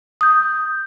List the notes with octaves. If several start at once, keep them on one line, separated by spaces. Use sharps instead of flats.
D#6 G6